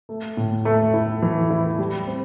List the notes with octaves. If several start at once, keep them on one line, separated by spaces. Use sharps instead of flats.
A3
A2
A3
E4
E3
E4
G3
C4